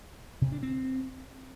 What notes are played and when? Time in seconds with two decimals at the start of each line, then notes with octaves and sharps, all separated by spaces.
0.41 C3
0.52 D4
0.63 C4